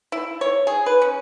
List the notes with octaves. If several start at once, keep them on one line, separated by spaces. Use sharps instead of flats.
E4
C#5
G#4
B4
C#4